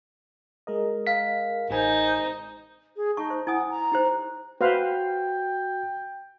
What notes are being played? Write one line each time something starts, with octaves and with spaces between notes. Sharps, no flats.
G#3 A#4 D#5
F5 B6
A1 D#4 C5 G#5
G#4
D#4 A5 C#6
C5
E4 F#5 G#5 D#6
A#5
D#4 G4 C5
F#4 B4 C5 F5 G5